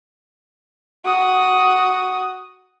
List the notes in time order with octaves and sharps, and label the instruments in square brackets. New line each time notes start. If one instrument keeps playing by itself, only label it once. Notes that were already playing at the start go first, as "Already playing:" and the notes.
[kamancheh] F#4 D#6